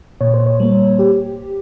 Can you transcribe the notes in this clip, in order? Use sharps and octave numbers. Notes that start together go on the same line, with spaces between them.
A#2 C#5
C5
C#5
G3 A#3
G4